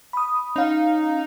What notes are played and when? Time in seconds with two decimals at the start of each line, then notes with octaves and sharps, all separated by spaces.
0.13 B5 D#6
0.56 C#4 D#4 F5